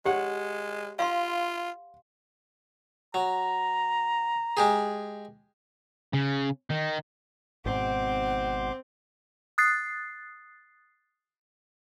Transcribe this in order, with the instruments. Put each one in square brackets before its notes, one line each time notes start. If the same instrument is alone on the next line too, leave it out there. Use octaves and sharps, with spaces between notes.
[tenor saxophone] G#3 [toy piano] G4 [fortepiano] C#5 F#5
[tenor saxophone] F4 [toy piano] F5 C6
[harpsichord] F#3 [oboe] A#5
[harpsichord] G#3 G4 G#4
[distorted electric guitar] C#3
D#3
[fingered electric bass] G#1 G#2 B2 [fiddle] C4 [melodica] C5 C6 D6 [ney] F#5
[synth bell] D#6 F#6 A6 C7